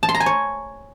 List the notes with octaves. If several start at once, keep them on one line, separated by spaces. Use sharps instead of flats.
A5
C6
A#5
G#5
C#5